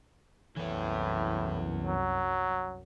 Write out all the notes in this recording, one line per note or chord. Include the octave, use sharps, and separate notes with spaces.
C2 F#2 A2 E3 B3
F#3